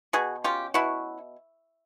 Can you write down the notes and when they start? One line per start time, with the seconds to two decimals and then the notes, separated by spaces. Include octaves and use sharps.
0.13 B2 F#4 G#4
0.44 C#4 F4 G4
0.74 B2 E4 F#4